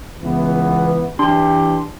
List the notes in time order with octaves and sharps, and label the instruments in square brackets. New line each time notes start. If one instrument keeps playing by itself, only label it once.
[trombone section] C#2 E3 B3
[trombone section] E3 G4 [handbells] D4 C6